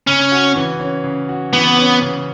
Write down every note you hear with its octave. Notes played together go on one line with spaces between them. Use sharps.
C#3 C#4
F#4
E3
C#4
C#3
F#4
E3 B3
C#4
C#3